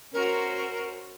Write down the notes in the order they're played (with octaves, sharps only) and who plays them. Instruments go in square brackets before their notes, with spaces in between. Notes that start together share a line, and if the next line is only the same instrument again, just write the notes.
[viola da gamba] C#4 F#4 C5 [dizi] A#4